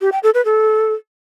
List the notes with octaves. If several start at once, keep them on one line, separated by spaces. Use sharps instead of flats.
G4
G5
A4
B4
A4